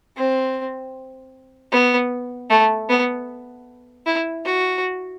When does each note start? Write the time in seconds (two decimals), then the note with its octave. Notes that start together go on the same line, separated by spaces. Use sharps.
0.17 C4
1.72 B3
2.50 A3
2.89 B3
4.06 E4
4.45 F#4